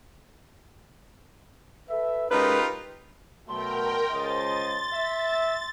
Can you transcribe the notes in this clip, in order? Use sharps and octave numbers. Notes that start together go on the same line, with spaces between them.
A4 B4 E5
G#3 C#4 D#4 F4 G4 A#4 B4
B2 F#3 A3 A#4 G5 C6
C#2 C5 D#5 A6
E5